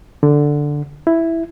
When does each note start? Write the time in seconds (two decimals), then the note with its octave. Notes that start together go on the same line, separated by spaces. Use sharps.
0.23 D3
1.07 E4